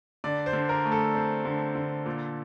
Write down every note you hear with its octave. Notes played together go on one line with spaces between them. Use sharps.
D3 D5
C5
D3
A#4
A3
A4
C4
D3
D3
A#2